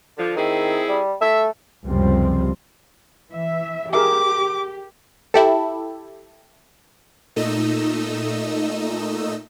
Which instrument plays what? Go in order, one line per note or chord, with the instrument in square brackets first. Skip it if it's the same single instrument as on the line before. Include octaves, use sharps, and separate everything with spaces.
[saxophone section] D3 F3
[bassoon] D#3 [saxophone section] C4 E4 G#4
[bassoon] G3
[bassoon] A3 [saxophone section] E5
[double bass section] C#2 F#2 C3 F3 G3 C4
[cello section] E3 E5
[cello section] G4 [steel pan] G#4 A#4 E5 [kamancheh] D6
[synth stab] E4 G4 A4
[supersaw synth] A#2 A3 D#4 D#5 E6